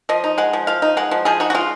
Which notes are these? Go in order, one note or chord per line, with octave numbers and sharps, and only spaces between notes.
F3 D#5
D#4
G#3 F#5
F3
F3 F5
D#4
G#3 F#5
F3
F3 G#4
D#4 F#4
F#4
G#3 F4